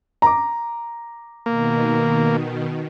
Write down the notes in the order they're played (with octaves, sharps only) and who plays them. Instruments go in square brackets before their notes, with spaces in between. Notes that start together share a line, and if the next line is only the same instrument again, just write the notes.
[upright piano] A#5 D6
[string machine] B2 D#3 [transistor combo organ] A#3